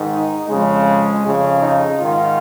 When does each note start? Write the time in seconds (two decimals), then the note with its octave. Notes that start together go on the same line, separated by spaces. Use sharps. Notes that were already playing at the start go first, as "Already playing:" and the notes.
Already playing: G#2 D#3
0.13 D#4
0.49 F2 C#3 G#3
1.24 F2 C#3
1.61 D#4
1.98 G#2 D#3 F4